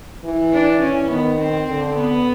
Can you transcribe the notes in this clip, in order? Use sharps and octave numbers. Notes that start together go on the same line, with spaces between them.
E3
D4
E3 C#4
D#3 B3
C4
D3
B3